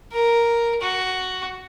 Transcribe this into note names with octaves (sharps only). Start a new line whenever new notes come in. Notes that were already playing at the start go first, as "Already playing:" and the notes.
A#4
F#4